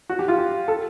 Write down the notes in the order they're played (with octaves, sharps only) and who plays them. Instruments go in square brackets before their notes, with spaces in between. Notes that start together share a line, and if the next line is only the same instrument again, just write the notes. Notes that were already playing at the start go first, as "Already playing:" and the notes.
[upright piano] F#4
G4
F4
G4
A4